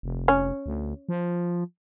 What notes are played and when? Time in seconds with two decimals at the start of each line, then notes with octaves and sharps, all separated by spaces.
0.03 F1
0.28 C#4
0.66 D2
1.09 F3